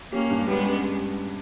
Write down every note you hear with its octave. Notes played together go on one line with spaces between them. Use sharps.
A#3 C#4 G4
G2
G3 G#3 B3
C#4